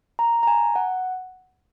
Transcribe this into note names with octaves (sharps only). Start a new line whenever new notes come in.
A#5
A#5
G#5
F#5